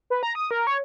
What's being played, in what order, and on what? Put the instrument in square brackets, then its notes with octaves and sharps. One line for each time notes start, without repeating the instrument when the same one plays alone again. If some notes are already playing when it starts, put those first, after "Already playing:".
[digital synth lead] B4
A#5
D#6
A#4
C#5